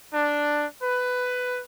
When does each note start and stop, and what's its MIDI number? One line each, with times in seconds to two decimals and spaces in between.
0.14 0.65 62
0.82 1.61 71